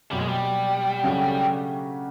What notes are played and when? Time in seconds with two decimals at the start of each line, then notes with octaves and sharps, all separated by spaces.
0.11 B2 F#3 G3 A#3
0.20 G#3
0.28 G3
1.04 C#3 F#3 A3 D4 G4